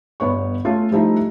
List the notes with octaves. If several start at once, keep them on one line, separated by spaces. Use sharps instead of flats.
G1 B3 C#5 C#6
A3 C#4 F4
F3 G3 A3 D#4 E4